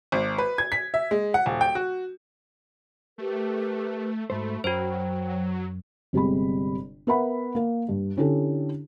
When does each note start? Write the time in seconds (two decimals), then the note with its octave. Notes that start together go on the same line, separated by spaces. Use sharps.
0.12 G#1
0.38 B4
0.58 G#6
0.72 B6
0.94 E5
1.11 G#3
1.34 F#5
1.46 D#1
1.61 G5
1.75 F#4
3.18 A3 G4 A#4 B4
4.30 G#2 A3 F#4 C5 B5
4.64 F#2 F#3 F#4 C5 G5
6.13 G1 C3 G3 G#3 B5
7.07 B3 A#4 E5 F#5 B5
7.55 A#3 A#4
7.89 G2
8.17 D3 C#4 D4 E4 G4 A4